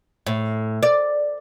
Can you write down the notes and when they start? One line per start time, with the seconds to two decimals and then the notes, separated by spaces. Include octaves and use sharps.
0.27 A2
0.83 D5